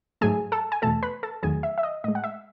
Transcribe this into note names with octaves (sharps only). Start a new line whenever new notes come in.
G#2 F#3 A3 G#4 G#5
A4 A5
G#5
E2 B2 A3 A4 A5
B4 B5
A4 A5
E2 D#3 F#3 A3 G#4 G#5
E5
E5
D#5
A2 G#3 D#5
F#5
E5